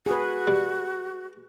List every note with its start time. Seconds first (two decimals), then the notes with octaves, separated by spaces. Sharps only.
0.06 F#4 G#4 B4
0.47 G3